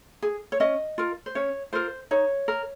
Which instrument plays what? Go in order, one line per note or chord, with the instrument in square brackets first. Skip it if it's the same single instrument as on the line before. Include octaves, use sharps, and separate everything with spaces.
[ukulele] G#4
C#5
C#4 D#5
F4 A#4
C5
C#4 C#5
F4 A#4 C5
D#4 C#5
A#4